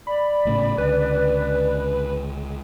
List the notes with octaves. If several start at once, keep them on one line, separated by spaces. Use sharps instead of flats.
D5 B5
G#1 A2 C#3
C#2 D3 B4